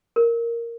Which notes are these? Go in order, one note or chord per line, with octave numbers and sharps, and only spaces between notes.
A#4